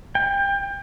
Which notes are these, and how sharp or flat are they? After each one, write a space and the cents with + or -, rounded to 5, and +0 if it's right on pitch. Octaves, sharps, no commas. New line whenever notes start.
G5 +25